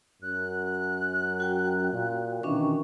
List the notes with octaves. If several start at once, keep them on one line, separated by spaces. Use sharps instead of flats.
F#2 F#6
F#4 G5
A#2
B2 D#3 E3 C#4 D4 C#6